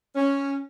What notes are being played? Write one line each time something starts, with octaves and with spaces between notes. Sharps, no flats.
C#4